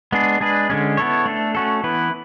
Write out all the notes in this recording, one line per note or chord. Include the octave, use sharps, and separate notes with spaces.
G#3 B3 D4 G#4
G#3 D4 G#4 B4
D3 G#3 C#4
B3 E4 A4 C#5
A3 D4 A4
A3 C#4 F#4 A4
E3 B3 E4 B4